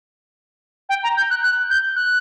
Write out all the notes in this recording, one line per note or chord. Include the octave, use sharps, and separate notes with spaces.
G5
A#5
G6
F#6
F#6
G6
F#6